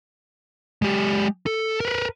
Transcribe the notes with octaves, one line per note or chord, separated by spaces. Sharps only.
G#3 G4
A4
A#4 B4